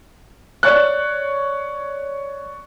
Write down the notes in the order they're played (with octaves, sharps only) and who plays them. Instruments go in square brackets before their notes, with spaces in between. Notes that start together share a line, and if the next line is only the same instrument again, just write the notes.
[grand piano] C#5 D5 F#6